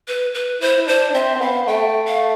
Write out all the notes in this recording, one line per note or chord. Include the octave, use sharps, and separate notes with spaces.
B4
B4
E4 C5
E4
D4 C5
D4
C4 E5
C4
B3 F5
B3
A3 G5
F5